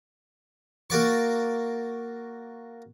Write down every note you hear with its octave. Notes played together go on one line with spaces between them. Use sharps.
A#3 F#4 D5 C#6